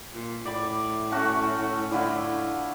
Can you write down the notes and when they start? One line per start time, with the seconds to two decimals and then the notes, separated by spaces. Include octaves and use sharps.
0.14 A#2
0.45 A2 D5 B5
1.12 A3 C#4 F#4
1.91 A2 D3 E4 F4